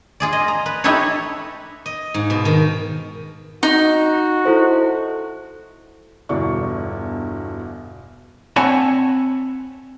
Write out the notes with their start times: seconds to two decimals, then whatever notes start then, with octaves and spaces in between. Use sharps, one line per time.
0.20 F4 G#4 D5
0.33 D#5
0.48 A#5
0.66 B4
0.84 D#4 E4 G4 A4 B4 C#5
1.86 D#5
2.14 G#2
2.30 B2
2.45 D#3
3.63 D#4 F#4
4.45 E4 A4 C5
6.29 G1 E2 B2 D4 C#6
8.56 C4 C#5 F#5 G#5 A5 B5